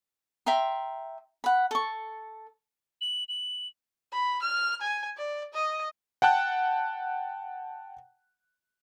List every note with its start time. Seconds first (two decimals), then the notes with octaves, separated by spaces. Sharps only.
0.46 E5 G5 A#5 C6
1.44 F#5 B5
1.71 A4 C#6
3.01 F#7
3.29 F#7
4.12 B5
4.42 F6
4.81 G#5
5.17 D5
5.54 D#5
6.22 F#5 G5 A5 F#6